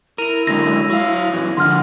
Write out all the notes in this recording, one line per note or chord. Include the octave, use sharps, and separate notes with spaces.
E4 A#4 D#7 F7
D3 F#3 G#3 A#6
F#3 F5
F#2 E3
D3 F3 F#5 C6 F6